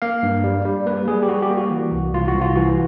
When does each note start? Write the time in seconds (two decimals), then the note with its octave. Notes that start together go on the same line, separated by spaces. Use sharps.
0.02 A#3 F5
0.23 G2
0.44 G3
0.65 G3
0.86 A#3 B4
1.08 G3 G#4
1.23 G4
1.28 G3 F#4
1.42 G4
1.50 A#3
1.57 F#4
1.71 E3
1.92 C2
2.13 C2 F4
2.28 F#4
2.35 C2
2.41 F4
2.56 E3 F#4